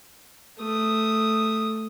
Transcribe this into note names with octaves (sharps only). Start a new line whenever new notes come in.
A3 D#6